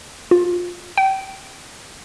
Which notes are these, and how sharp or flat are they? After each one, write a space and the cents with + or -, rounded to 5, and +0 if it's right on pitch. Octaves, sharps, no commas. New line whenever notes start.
F4 +15
G5 -30